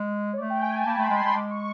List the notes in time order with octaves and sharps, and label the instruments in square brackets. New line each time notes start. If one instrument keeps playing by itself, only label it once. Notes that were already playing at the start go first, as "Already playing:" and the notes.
Already playing: [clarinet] G#3
[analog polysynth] C#5
[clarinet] A3 [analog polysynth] D5
[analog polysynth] G5
G#5
A5
[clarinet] A#3 [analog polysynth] B5
[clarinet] A3 [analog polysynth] C6
[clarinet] G#3
[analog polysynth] B5
C6
[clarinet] G#3
[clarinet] G#3 [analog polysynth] D6
[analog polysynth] C#6